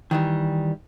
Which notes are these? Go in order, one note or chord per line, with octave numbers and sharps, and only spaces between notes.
D#3 E3 G3